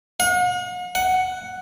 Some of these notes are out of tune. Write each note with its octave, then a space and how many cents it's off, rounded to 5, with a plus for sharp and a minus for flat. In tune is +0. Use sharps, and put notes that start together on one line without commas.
F#5 -45
F#5 +5